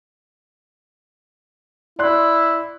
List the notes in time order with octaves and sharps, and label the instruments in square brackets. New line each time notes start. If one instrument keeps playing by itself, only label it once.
[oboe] E4 [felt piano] D5 C6 F#6